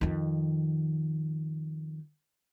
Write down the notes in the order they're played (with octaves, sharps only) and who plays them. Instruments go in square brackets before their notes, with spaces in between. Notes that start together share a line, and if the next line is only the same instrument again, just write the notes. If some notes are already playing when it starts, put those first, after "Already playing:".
[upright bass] F2 D#3